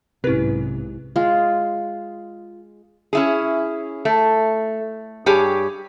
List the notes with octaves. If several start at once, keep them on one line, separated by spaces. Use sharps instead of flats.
B1 G#2 C3 C#4 E4 G4 B4
G#3 F4
C#4 E4 G#4
A3
G2 G4 G#4 C#5 G#5